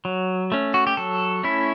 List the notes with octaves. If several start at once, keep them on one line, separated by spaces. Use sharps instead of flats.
F#3
A3 C#4
F#4
G4
F#3 A4
A3 C#4 E4